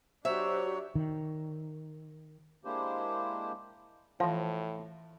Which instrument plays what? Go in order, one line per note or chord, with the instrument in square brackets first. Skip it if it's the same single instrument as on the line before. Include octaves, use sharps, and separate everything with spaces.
[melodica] F#3 C#5 [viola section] D4 F#4 G4 [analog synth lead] C5 [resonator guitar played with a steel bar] E5
[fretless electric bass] D#3
[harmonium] G#3 A#3 D4 E4 G4 C5
[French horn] A2 [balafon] E3 C#5 [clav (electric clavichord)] F3